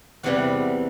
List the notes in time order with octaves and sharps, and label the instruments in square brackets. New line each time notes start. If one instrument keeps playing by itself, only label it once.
[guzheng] E2 C3 E3 G3 F#5